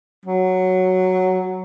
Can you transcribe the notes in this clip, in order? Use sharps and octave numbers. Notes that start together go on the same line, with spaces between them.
F#3